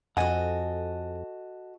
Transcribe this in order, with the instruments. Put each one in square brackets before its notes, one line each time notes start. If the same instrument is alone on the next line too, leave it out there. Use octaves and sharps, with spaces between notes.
[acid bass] F2 [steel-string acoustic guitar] F#4 A4 D#5 [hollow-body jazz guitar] F#5 G#5